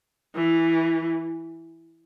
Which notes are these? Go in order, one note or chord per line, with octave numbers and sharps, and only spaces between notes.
E3